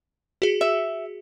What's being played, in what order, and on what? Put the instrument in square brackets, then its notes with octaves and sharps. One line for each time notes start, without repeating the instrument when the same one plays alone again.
[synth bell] F#4 G#4
[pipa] E5